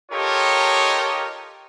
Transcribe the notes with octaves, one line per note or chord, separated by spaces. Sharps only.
D#4 F4 G4 A4 A#4 C#5